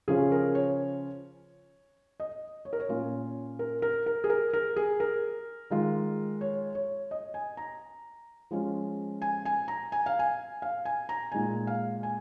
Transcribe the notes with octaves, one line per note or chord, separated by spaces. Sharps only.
C#3 F3 C#4 F4 G#4
A#4
C#5
D#5
C#5
A#4
C#5
A#2 A#3 C#4 F4
A#4
A#4
A#4
G#4
A#4
A#4
G#4
A#4
D#3 G#3 F4
C#5
C#5
D#5
G#5
A#5
F3 G#3 C#4 F4
G#5
G#5
A#5
G#5
F5
G#5
F5
G#5
A#5
A#2 G#3 D#4 G#5
F5
G#5